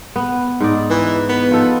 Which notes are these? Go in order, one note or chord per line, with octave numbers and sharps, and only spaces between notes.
B3
G#2 D#4 D5
E3
B3
F3 D#4 A4